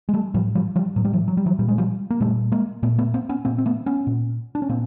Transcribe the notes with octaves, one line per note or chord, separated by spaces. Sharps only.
G#3
G3 A3
A2 F3 G3
F3 G3
F3 G3
A2 F#3
G3
E3 F#3
F#3
G3
E3 F#3
A#2 G3
G#3
F3 G3
A#3
A#2 G3 A3
G#3 A#3
A#2 A3 B3
A3 B3
A#3 C4
B3 C#4
A#2 A#3 C4
C4
A3 B3
B3 C#4
A#2
D4
C#4
A#2 A#3 C4